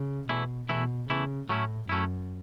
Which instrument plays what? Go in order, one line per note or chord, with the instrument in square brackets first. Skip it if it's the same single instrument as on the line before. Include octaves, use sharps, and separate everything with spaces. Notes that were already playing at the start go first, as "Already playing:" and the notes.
Already playing: [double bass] C#3
[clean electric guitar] E2 E3 A3 E4 [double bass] B2
[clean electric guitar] E2 E3 A3 E4 [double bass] B2
[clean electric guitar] E2 E3 A3 E4 [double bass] C#3
[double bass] A2 [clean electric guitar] F#3 A3 C#4 E4
[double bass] F#2 [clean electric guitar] F#3 A3 C#4 E4